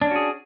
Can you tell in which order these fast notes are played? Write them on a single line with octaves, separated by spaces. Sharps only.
D4 C#4 F#4 G#4